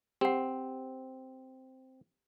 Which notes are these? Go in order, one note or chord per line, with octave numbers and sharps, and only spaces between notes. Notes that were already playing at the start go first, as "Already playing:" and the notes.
C4 G4 F#5